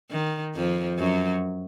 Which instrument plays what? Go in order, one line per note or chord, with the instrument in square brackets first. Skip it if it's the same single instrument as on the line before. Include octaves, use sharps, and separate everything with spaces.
[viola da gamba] D#3
F2 F3
F#2 F#3